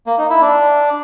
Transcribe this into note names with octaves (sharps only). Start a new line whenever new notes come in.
A#3
D#4
E4
D4